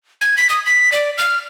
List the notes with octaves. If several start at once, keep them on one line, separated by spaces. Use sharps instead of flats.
G#6
B6
D#6
B6
D5
F6